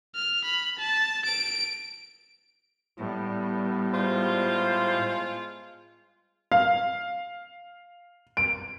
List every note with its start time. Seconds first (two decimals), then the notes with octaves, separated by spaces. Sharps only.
0.15 F6
0.45 B5
0.79 A5
1.26 D7
2.99 A2 G3 B3
3.94 G#3 F4 C5
6.52 F5
8.37 D7